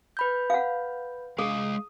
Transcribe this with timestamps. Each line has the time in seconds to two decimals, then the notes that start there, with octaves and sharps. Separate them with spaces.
0.17 B4 B5 G6
0.50 F5 F#5
1.38 G#3 G#4 F5 D#6